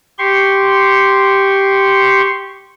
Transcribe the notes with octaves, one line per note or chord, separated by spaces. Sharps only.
G4 C6 C#6